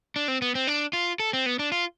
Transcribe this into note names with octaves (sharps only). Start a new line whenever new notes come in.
D4
C4
B3
C4
D4
F4
A4
C4
B3
D4
F4